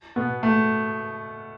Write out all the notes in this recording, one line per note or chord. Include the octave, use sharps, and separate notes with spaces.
B2 B3
A3